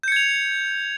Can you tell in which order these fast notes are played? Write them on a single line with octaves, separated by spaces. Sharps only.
G6 C#7 G#6 F7